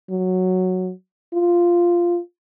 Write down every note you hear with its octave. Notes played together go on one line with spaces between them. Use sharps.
F#3
F4